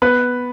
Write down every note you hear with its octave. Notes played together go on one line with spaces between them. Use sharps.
B3 B4